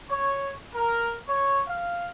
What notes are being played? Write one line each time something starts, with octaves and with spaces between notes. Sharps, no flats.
C#5
A#4
C#5
F5